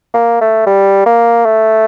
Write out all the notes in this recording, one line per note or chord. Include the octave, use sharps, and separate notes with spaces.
A#3
A3
G3
A#3
A3